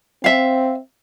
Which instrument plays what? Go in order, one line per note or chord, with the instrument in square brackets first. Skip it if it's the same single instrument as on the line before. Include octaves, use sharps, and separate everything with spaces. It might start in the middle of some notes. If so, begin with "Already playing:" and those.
[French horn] C4 [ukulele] E5 F5